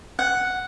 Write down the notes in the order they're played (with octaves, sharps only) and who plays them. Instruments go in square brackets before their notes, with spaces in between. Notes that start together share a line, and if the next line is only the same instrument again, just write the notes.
[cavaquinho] F#5